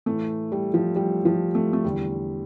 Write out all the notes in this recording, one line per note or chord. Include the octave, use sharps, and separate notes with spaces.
A2 E3 A3
G3
F3
G3
F3
A3
A3
E2 D3 G3